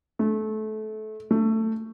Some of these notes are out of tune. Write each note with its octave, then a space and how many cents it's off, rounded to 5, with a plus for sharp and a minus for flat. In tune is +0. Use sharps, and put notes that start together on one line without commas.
A3 -25
A3 +15